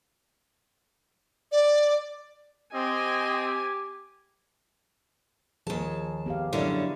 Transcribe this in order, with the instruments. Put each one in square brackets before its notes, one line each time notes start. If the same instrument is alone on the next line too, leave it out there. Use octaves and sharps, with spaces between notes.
[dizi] D5
[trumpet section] C4 [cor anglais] G4 [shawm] D#5 [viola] G#5
[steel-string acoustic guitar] D#2 A5 [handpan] F3 G#4
[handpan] B3 G4 F5
[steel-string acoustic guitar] F#2 D3 C#4 [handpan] E4 D5